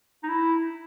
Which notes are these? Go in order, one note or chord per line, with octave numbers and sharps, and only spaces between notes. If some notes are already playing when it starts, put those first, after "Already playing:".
D#4
E4